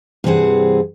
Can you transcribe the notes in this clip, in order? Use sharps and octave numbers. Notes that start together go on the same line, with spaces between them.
G2 C3 E3 C4 G#4 F#5